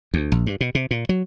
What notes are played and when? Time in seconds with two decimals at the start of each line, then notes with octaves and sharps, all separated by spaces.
0.14 D2
0.32 A#1
0.46 G2
0.61 B2
0.75 C3
0.91 A#2
1.09 F#3